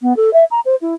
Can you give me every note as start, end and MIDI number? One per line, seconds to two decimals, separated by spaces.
0.01 0.15 59
0.16 0.32 69
0.33 0.44 76
0.51 0.60 82
0.65 0.75 72
0.81 0.94 64